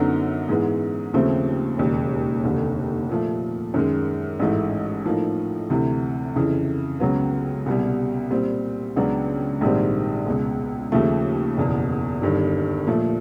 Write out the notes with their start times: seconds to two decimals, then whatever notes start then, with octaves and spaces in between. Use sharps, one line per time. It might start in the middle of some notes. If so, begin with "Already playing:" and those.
Already playing: F#2 D3 F#3 B3 D#4
0.49 G#2 E3 G#3 B3
1.14 D#2 C#3 F3 A3 C4
1.78 E1 D#2 C#3
2.44 F1 D#2 D3
3.09 A#2 F3 A3
3.74 F#2 D#3 G#3
4.39 A1 G#2 E3 A3
5.05 A2 F3 A#3 D#4
5.70 D2 C3 E3
6.36 F2 C#3 E3
7.00 C#2 C#3 F#3 B3
7.66 C2 B2 G3
8.31 A#2 G3 C4
8.96 C#2 C#3 F#3 B3 D4
9.61 A#1 G#2 D#3 G3 C4
10.26 C#2 B2 G#3
10.92 D#2 C#3 F3 A3
11.57 F#1 E2 B2
12.22 G1 G2 D#3
12.87 A#2 F3 A3